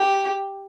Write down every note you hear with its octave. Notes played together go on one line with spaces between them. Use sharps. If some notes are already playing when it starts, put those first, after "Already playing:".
Already playing: G4